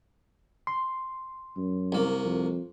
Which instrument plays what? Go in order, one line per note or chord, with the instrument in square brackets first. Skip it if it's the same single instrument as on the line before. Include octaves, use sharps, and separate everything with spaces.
[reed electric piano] C6
[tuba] F#2
[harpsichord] C2 A#3
[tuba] F2